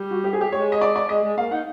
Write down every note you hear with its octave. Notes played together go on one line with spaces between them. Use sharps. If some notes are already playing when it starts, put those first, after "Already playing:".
Already playing: G3
F#4
G4
G#4
G4
G#3 C#5
D#5
D5
D5
G#3 D#5
G#3
A#3 F5
D#4 F#5